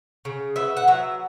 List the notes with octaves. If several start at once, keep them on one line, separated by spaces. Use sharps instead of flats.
C#3
B3 E5
F#5
F#3 E5